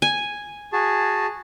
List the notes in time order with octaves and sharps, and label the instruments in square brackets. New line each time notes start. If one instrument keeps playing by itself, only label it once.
[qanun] G#5
[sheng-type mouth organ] F#4 G#4 A5